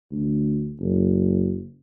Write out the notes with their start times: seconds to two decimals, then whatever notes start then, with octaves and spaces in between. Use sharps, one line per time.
0.12 D2
0.80 F#1